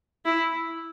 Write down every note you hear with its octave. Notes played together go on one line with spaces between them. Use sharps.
E4